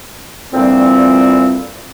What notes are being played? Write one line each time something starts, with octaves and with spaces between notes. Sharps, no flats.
A#2 D3 E3 F3 G3 C4